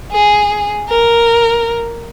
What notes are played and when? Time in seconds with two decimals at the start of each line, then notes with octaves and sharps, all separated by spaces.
0.12 G#4
0.89 A#4